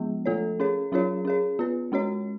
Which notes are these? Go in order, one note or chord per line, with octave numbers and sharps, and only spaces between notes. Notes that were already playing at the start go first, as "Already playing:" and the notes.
Already playing: F3 G#3 B3
F3 A3 F4 A4 C#5
C#4 G#4 C#5
F#3 C#4 F4 G#4 C#5
C#4 G#4 C#5
B3 F4 B4
G#3 C#4 F#4 C#5